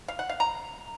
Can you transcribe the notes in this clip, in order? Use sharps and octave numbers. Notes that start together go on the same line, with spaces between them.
F5
F#5
F5
A#5